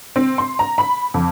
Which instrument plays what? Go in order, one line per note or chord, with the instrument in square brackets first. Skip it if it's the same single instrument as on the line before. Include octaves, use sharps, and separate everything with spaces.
[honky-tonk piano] C4
C6
A#5
B5
F2